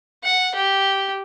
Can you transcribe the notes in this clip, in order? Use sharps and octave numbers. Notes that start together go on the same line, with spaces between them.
F#5
G4